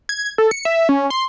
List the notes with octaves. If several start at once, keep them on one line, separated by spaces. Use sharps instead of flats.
G#6
A4
C#7
E5
C#4
C6